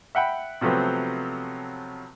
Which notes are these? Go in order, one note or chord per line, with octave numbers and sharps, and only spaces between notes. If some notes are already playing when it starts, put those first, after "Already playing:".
E5 F#5 G5 B5
C3 F3 F#3 A3 B3 C4